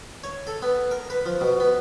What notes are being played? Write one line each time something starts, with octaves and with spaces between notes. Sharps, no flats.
C#5
A4
B3
A#4
B4
F3
B2
B3